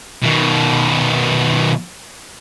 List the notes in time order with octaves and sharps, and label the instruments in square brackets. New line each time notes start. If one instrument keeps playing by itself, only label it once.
[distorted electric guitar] B2 D#3